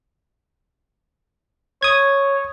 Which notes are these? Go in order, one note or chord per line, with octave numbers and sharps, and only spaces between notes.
C#5 D#6 G#6